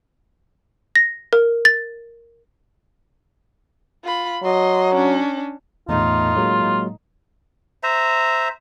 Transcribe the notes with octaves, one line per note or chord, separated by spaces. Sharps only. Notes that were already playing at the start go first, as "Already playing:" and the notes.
A#6
A#4
A6
F4 B5
F#3 D#5 C6
C#4 D4
E2 A2 A3 D#4 F4
F#3 G#3 A#3
C5 E5 A#5